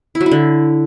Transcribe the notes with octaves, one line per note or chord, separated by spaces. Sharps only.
E4
F#3
E4
D3